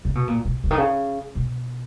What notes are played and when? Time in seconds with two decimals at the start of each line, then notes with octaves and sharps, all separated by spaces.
0.05 C#3
0.15 B2
0.27 A#2
0.45 B2
0.64 C#3
0.71 D#3
0.78 C#3
1.35 B2